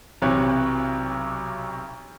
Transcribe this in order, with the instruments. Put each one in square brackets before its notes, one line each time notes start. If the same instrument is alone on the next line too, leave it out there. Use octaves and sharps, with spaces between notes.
[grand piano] B1 C3 E3 C#5 F#6